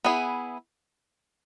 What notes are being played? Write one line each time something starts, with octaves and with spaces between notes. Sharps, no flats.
B3 E4 G#4